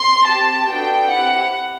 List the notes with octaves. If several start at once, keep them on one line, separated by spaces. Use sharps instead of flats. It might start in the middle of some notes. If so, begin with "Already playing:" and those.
Already playing: C6
C4 G4 A5
B3 D4 F#4 A4 G5
C4 E4 G4 F#5